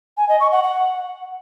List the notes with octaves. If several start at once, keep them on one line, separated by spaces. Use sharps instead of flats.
G#5
D#5
C#6
F#5
F#5